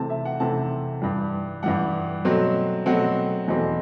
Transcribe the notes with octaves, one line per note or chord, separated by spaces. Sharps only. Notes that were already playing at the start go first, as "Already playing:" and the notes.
Already playing: C3 E3 A3 C4 A5
E5
F#5
C3 E3 A3 C4 A5
G2 E3 G3
G2 E3 G3 F#5
B2 F#3 A3 C4
B2 F#3 A3 C4 F#5
E2 B2 A3 C4